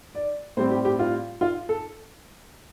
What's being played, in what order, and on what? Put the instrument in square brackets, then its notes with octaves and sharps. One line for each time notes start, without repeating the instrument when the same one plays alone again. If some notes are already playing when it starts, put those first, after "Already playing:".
[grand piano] D5
A2 G3 C4 C5
G4
G4
F4
F4
A4